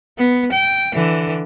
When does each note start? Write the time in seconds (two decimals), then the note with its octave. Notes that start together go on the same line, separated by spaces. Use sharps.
0.18 B3
0.52 G5
0.94 D3 E3